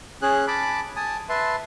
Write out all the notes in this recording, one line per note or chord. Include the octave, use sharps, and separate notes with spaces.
C#4 G#4 F#6
A5 B5 D6
G#5 A5 D#6
B4 E5 A5 C6